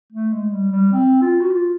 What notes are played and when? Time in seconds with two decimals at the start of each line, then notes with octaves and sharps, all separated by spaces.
0.12 A3
0.33 G#3
0.52 G3
0.72 G3
0.92 C4
1.22 F4
1.41 F#4
1.51 F4